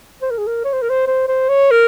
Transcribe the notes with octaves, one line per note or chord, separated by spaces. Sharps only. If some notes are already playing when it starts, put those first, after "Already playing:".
C5
A#4
G#4
A#4
C#5
C5
A#4
C5
C5
C5
C#5
A#4